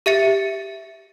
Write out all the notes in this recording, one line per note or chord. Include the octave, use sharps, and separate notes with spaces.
G4 E5 A6 C#7